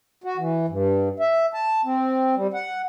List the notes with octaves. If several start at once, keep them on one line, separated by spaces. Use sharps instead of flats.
F#4
E3
G2
E5
A5
C4
G3
F#5